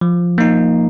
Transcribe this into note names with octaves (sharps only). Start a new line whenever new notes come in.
F3
A#3 D#4